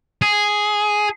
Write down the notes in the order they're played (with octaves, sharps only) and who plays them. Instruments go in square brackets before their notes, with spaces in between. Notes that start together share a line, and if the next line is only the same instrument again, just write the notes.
[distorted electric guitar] G#4